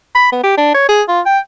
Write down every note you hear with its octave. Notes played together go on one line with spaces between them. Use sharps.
B5
B3
G4
D4
C#5
G#4
F4
G5